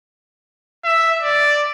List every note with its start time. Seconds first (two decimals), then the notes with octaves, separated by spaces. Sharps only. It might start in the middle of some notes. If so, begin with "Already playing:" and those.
0.84 E5
1.22 D5